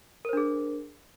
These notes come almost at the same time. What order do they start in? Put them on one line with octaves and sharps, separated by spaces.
A#4 C5 D4 G#4